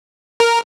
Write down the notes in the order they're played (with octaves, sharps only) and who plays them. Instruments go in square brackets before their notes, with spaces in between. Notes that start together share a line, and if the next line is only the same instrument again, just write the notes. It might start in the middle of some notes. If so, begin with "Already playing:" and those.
[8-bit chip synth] A#4